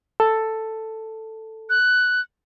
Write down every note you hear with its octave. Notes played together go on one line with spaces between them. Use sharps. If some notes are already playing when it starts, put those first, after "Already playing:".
A4
F#6